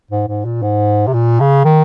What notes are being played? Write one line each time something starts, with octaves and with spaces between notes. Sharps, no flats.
G#2
G#2
A#2
G#2
C3
A#2
C#3
D#3